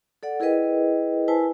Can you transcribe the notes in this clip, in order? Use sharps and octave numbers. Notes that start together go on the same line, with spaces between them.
A4 D5 F#5
E4 G#4 A#4 B4 D#5 G5
E4 B4 C5 G#5 A5